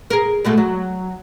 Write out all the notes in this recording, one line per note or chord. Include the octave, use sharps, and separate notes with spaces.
G#4 A#4
B2 G#3 A3
F#3